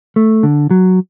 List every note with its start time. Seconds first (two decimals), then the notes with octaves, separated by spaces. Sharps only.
0.16 A3
0.43 D3
0.71 F#3